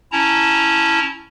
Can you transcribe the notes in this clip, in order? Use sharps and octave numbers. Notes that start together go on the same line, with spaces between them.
C#4 E4 A5 A#5